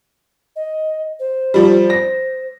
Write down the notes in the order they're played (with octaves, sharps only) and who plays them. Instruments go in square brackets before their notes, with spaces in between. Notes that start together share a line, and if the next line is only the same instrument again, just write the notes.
[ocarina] D#5
C5
[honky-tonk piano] F3 G3
A#6